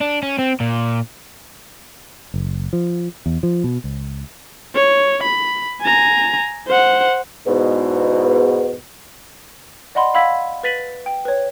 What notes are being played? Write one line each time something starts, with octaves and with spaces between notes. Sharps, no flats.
D4
C#4
C4
A#2
F#1
F3
E2
F3
B2
C#2
C#5
B5
G#5 A#5
C5 F#5
E2 G#2 B2
D5 D#5 F#5 B5 C6
F5 F#5 B5 E6 G#6 B6
B4 A6 B6 D#7 F#7
G5
B4 C#5